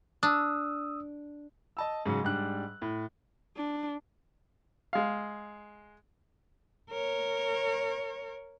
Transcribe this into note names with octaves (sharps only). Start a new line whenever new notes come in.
D4 D#6 E6
D#5 A5 E6
G#2 C#3 F#3
G#2 G3 D4 F#6
A2
D4
G#3 F5
A#4 C#5